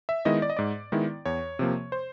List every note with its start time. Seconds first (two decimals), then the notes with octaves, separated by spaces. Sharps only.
0.09 E5
0.25 D#3 G#3 B3 E4 D#5
0.42 D5
0.50 D#5
0.57 G#2 D5
0.92 D#3 G#3 B3 E4
1.25 E2 C#5
1.59 C3 F3 A#3
1.92 C5